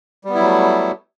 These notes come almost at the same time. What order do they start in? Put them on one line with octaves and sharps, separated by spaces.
G3 B3 E4 F#3 A3